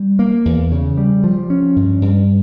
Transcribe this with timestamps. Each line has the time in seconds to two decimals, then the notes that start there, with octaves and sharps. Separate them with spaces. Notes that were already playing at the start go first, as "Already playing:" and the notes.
Already playing: G3
0.19 A#3
0.45 E2
0.72 C#3
0.97 G3
1.24 F3
1.50 C#4
1.76 G2
2.02 G2